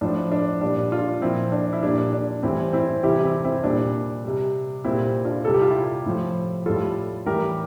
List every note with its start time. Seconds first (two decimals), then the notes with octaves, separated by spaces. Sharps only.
0.01 A2 F3 D4
0.32 D4
0.61 A#2 G3 D4
0.92 D4 F4
1.22 A#2 F3 C4 E4
1.52 D4
1.73 E4
1.83 A#2 G3 D4
2.13 D4
2.43 A2 E3 G3 C4 E4
2.73 C4 E4
3.03 C3 E3 G3 E4 G4
3.24 C4 E4
3.44 C4 E4
3.64 A#2 G3 D4
4.24 C3 G3
4.84 A#2 G3 C4 E4
5.25 D4 F4
5.45 C3 G3 A4
5.54 G4
5.62 F4
5.70 E4 G4
6.06 A2 F3
6.66 A2 G3 F4 A4
7.26 A2 E3 G3 G4 A#4